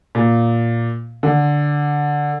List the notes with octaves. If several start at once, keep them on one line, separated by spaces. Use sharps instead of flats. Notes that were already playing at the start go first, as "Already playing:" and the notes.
A#2
D3